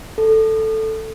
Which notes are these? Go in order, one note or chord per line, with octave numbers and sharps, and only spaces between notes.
A4